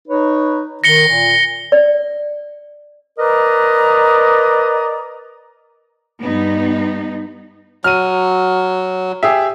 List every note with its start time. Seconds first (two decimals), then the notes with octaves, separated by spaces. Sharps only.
0.08 D#4 B4 C#5
0.84 D#3 A#6 C#7 G7
1.06 A#2
1.72 D5
3.19 A#4 B4 D5 D#5 A#5
6.21 G2 B3 D#4
7.84 F#3 F6 D#7
9.23 G4 G#4 E5